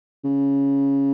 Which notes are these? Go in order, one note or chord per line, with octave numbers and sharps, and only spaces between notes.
C#3